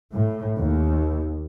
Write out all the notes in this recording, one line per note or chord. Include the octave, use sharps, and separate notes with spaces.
A2
D#2